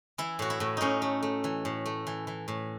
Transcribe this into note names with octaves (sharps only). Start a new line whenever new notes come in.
E3 E4
A2 F#4
E4
A2
A2 C#4 D#4
A3
A3
E3
A2
A3
E3
E3
A2